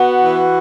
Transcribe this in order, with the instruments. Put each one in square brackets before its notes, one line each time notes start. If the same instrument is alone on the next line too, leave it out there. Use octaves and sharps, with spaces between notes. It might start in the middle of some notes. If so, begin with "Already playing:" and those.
Already playing: [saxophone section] B3 [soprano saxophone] F#4
[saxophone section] E3